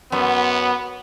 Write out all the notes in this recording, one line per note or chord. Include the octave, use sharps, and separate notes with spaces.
F#2 B3